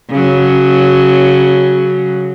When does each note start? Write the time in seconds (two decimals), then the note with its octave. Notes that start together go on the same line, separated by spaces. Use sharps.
0.10 C#3 F#3